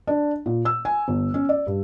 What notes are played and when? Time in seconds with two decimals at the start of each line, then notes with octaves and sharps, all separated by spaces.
0.07 D4
0.46 A#2
0.65 E6
0.85 G#5
1.08 G1
1.34 C#4
1.49 D5
1.67 G2